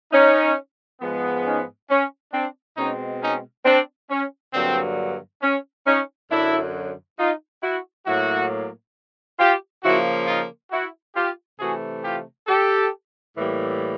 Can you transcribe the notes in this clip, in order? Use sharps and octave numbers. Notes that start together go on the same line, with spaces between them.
C#4 D#4
G#2 F3 G#3 B3
C#4 D#4
C#4
C4 D4
B2 G#3 C4 C#4 D#4
C#4 D#4
C4 D4
C#4
G2 D3 F#3 A#3 C4
C#4
C#4 D#4
F#2 D3 F#3 D4 E4
D#4 F4
E4 F#4
A2 F#3 A#3 E4 F#4
F4 G4
C#3 F3 A#3 E4 F#4
D#4 F4
E4 F#4
F4 G4
C3 E3 A3 F#4 G#4
F4 G4
G4 A4
A2 E3 G3 A#3